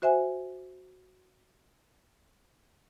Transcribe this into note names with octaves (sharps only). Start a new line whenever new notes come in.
F#4 C5 E5 F#5 G#5